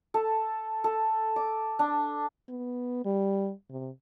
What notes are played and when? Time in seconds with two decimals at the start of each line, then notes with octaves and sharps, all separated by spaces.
0.14 A4
0.84 A4
1.36 D6
1.79 D4
2.49 B3
3.05 G3
3.70 C3